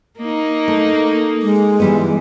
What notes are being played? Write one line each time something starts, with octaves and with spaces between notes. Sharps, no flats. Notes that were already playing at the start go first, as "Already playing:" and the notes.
A#3 D#4
A3
G#3
E3 G3 B3